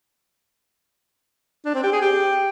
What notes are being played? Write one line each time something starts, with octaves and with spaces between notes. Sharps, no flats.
D4
C4
G4
G#4
G4